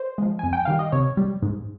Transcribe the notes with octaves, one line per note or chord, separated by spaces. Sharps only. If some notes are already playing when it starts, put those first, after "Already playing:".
Already playing: C5
F3 G#3
F2 G#5
G5
D#3 G3 F5
D#5
C3 C#5
G3
G#2